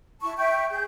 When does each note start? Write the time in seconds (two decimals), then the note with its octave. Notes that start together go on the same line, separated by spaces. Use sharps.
0.21 E4 A5 C#6
0.37 E5 G5 C#6 G6
0.70 G#4 G6